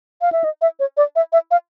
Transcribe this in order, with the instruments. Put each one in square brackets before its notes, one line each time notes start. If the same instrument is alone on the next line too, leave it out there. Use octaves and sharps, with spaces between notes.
[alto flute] F5
E5
D#5
E5
C#5
D5
E5
E5
F5